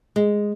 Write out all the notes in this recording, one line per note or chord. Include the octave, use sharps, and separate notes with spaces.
G#3